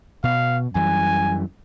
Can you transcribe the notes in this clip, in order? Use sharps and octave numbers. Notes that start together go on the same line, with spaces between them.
B2 F5
F#2 E3 G3 G#5